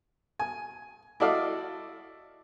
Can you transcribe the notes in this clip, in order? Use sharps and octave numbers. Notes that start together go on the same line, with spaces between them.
G#5
E4 F#4 A4 D5 D#5 F5